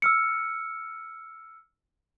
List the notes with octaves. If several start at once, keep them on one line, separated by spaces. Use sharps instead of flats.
E6 F6 C#7